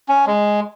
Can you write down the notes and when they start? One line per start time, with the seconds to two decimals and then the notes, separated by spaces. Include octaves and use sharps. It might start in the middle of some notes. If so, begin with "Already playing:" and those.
0.09 C#4
0.27 G#3